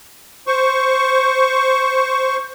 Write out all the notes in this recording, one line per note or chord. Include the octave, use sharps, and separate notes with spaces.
C5 C#6